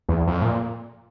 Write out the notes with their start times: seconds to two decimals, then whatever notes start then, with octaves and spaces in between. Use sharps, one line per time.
0.09 E2
0.27 F2
0.42 A2
0.45 A#2